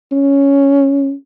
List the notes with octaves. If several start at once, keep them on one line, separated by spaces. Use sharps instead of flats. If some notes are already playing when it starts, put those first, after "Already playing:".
C#4